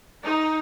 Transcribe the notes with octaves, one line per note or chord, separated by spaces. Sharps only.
D#4